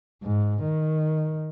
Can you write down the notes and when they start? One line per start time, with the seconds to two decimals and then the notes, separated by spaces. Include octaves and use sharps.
0.23 G#2
0.63 D#3